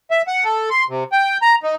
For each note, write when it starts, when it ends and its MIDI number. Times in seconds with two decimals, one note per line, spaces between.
0.11 0.22 76
0.28 0.44 78
0.44 0.70 69
0.71 0.85 84
0.89 1.04 48
1.12 1.38 79
1.42 1.55 82
1.63 1.75 63